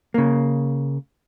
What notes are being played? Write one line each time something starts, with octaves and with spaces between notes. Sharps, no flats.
C#3 A#3